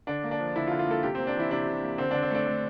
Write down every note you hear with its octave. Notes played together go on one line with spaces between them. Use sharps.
D3 D4
A#3
D4
F3
D3 E4
F4
D3
F4
A#3 A4
C3 G4
A#3 C4
D4
E3 E4
C3 D4
C3
A#3
D3 C4
D3 D4
C4
A3 D4
A3